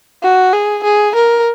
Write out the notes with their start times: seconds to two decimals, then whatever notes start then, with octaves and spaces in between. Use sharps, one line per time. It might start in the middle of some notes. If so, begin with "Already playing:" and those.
0.23 F#4
0.53 G#4
0.83 G#4
1.15 A#4